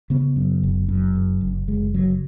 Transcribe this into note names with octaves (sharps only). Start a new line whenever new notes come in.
C#3 B3
F#2
F#1
F#2
F#1
F#1
F#1 G#3
C#3 F#3